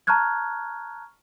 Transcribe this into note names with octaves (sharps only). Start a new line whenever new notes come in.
A5 A#5 C#6 F6 F#6 G#6